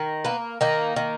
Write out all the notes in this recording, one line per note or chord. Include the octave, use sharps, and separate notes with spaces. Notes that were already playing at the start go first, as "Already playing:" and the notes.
Already playing: D#3
A#3 B3
D#3 A#3 D#4
D#3